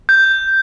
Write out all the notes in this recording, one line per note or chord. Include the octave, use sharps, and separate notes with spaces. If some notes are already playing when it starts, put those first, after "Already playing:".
G6